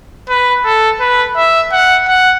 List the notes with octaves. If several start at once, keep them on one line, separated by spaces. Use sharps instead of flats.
B4
A4
B4
E5
F#5
F#5